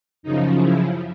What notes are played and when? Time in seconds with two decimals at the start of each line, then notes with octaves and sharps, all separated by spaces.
0.23 F#2 C#3 F3 D#4
0.60 E4